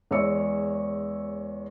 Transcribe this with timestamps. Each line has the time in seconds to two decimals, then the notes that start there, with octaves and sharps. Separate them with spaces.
0.11 E2 G#3 C#5 E6 C#7